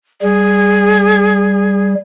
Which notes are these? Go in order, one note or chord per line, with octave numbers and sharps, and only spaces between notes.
G3 G#4